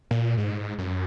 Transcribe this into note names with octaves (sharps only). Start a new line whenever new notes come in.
A#2
G#2
F#2